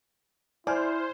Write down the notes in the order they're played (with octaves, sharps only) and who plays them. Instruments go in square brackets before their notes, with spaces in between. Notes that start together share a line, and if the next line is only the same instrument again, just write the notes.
[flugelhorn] E4 [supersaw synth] C5 [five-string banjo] D5 [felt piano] G#5 F6